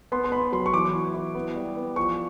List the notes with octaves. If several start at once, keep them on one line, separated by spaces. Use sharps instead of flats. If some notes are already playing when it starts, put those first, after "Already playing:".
B3 C6
C6
B3 B5
F#3 C6
C#6
E3 D6
E4
E4
B3
G3
B3
F3 C#6